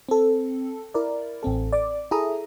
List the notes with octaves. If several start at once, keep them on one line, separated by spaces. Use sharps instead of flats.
C4 A4
E4 A#4 D5
A1 C4 A4
D5 D6
E4 G#4 A4 E5 A#5 D#6